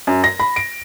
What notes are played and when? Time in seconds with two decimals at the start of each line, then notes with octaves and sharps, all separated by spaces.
0.07 F#2
0.24 A#6
0.40 B5
0.56 D7